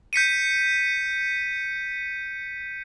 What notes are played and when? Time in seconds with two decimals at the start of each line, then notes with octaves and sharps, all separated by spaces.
0.13 G6 B6 C#7 D#7